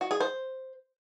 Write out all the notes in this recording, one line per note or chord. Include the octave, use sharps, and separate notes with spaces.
F#4
G#4
C5